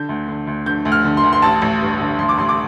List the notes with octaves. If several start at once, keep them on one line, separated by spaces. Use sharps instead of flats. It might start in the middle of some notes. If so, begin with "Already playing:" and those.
Already playing: D3 G6
D2
D3
D2
D3 G6
D2
F6
D3
C6
D2
C6
A1 A5
A1
G2
D3
A1 C6
D6
A1 C6
D6